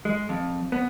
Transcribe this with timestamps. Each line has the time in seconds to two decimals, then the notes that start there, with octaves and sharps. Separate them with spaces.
0.05 G#3
0.29 F2
0.72 B3